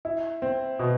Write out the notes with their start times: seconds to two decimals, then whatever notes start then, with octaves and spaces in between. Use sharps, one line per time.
0.05 E4
0.42 C4
0.79 B2